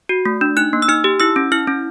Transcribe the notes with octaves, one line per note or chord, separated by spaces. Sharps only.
F#4
A3
D4
D#4 F#6
A#3
E6
D#4 F6
G4
E4 E6
C#4
E4 F6
C#4